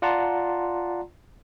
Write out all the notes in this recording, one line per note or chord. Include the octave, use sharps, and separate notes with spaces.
F4 D5 F#5 A5 A#5 C6